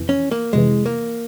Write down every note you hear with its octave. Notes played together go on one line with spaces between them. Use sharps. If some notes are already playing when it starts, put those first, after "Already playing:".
Already playing: F2 C3 E3
C#4
A#3
F2 C3 E3 G#3
A#3